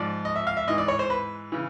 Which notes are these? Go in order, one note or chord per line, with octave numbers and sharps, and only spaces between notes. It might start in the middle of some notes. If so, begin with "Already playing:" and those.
Already playing: G#2 F3 D5
D#5
E5
F5
E5
G#2 E3 D#5
D5
C#5
C5
B4
C#3 E3